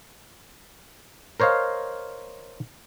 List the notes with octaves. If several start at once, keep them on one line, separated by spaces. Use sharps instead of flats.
A#4 C5 C#5 D#5 F5